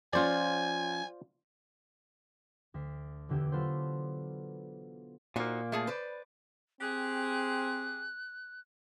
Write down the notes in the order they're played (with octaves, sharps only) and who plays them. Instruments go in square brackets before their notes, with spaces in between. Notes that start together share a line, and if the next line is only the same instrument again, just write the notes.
[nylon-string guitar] F3 C#4 [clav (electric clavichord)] F4 C5 D5 [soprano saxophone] G#5
[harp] D2 D4 B6 C7
E1 E2 D3 G4 E5 G#6
F#3 B3 F4 A4 B4 C5
[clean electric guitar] A#2 A#3 [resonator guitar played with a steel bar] D#4 F#4 C5
[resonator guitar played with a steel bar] A3 G#4 A5
B4 C5 D5
[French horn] C4 [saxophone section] G4 G#4 [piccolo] F#6